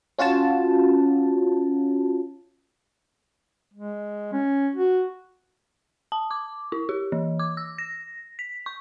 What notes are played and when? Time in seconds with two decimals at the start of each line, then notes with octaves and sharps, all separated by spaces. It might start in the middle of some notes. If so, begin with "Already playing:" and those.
0.18 C#4 F4 F#4 C#5 A5
3.74 G#3
4.33 C#4
4.75 F#4
6.12 A5
6.31 D6
6.72 E4
6.89 G4
7.12 E3
7.40 D6
7.57 E6
7.78 A#6
8.39 B6
8.66 C#6